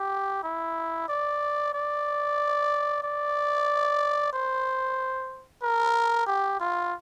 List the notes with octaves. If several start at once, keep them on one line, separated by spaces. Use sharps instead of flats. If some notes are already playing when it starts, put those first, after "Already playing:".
Already playing: G4
E4
D5
D5
D5
C5
A#4
G4
F4